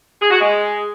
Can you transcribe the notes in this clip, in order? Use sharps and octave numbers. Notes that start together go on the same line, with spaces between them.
G#4
F#4
G#3